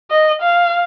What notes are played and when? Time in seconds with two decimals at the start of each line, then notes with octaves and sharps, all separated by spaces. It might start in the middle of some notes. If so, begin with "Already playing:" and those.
0.11 D#5
0.42 F5